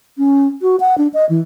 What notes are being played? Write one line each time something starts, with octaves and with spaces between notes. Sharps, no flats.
C#4
F#4
F#5
D4
D#5
E3